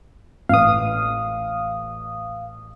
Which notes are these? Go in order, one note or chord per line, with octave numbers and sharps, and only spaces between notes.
A1 B4 F5 D#6